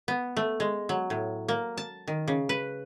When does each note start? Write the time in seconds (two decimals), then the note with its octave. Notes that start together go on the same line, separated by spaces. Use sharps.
0.08 B3
0.37 A3
0.60 G#3
0.89 F#3
1.10 A2
1.48 A#3
1.77 A5
2.07 D#3
2.28 C#3
2.49 B4